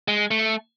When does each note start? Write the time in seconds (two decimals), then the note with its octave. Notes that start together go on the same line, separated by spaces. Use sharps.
0.08 G#3
0.31 A3